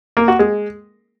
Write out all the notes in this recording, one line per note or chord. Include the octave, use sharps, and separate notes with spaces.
A#3
F#4
G#3